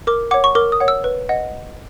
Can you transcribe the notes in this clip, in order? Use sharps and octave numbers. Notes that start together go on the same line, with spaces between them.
A#4 D6
C#5 F#5 D6
C#6
A#4 D6
D#6
C#5 F#5
E6
B4
D#5 F#5